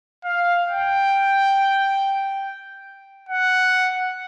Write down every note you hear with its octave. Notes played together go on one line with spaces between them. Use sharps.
F5
G5
F#5